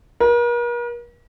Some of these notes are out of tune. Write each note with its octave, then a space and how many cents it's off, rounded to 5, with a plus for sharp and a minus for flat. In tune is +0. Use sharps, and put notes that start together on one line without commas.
A#4 +45